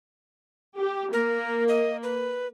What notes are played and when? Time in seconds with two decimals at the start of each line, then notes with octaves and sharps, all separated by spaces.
0.77 G4
1.13 A#3 A#4
1.68 D#5
2.03 B4